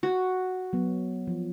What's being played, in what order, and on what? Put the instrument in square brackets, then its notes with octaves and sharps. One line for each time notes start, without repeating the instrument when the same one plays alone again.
[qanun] F#4
[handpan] F#3 B3
F3